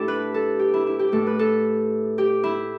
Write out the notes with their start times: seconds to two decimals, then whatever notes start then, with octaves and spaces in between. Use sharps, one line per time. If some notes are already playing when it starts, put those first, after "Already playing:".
Already playing: A2 A3 D4 E4 G4 A4
0.08 B4
0.34 A4
0.59 G4
0.74 E4
0.87 E4
0.99 G4
1.12 A2 A3 A4
1.27 B4
1.39 A4
2.18 G4
2.44 E4